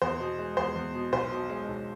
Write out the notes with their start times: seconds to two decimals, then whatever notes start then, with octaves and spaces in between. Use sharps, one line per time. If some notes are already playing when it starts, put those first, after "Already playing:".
0.02 E2 C5
0.19 B2
0.39 G#3
0.57 E2 C5
0.75 E2
0.94 B2
1.12 B1 C5
1.31 B2
1.50 G#3
1.68 B1